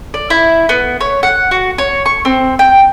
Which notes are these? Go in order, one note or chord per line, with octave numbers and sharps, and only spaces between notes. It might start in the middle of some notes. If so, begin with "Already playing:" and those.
D5
E4
B3
C#5
F#5
F#4
C#5
C#6
C4
G5